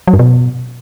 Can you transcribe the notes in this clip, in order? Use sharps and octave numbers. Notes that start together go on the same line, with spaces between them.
F#3
G2
B2